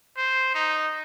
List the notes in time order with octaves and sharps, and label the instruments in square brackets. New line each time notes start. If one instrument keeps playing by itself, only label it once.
[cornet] C5
D#4